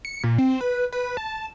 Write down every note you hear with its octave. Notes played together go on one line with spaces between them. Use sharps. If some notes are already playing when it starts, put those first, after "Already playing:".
C#7
A#2
C4
B4
B4
A5